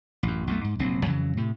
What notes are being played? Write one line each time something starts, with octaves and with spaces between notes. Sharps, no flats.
A1 F#2
B1 F2 A3
G#2
F1 A#1 F#3 C4
F2 C#3 E3 F#3
A2 C3